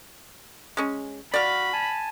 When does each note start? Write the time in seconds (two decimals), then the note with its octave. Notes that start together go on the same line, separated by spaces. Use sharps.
0.77 G#3 C#4
1.34 F#4 D5 F5 B5
1.73 G#5 A5